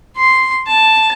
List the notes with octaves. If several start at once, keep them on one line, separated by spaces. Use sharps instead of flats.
C6
A5